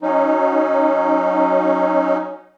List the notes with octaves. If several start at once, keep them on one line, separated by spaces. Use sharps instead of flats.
F#3 C#4 D#4